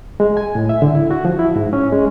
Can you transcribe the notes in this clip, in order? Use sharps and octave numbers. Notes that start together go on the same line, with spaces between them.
G#3
G#5
A2
E5
D3
E4
F#4
F3
E4
G#2
C#4
G#3